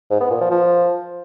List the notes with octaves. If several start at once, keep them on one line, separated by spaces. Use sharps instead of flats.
G#2
B3
A#2
F3
F3